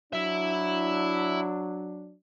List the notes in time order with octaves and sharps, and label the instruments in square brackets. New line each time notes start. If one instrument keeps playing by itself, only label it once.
[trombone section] F#3 D4 [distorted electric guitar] E4 E5